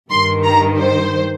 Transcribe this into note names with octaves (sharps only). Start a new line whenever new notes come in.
G2 D#3 C6
A#5
C5